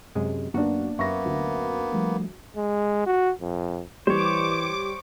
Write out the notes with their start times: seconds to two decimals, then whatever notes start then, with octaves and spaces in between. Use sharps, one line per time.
0.15 F#2 C3 G#3
0.54 F#2 A#3 B3 D4 F#4
0.99 F#2 A#3 B3 E5 C#6 A#6
1.25 D2
1.93 F3 G3 A3
2.57 G#3
3.07 F#4
3.41 F2
4.07 E3 G3 C5 C#5 D6